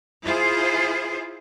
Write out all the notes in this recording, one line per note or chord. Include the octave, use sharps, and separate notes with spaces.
E4 F4 G#4 C5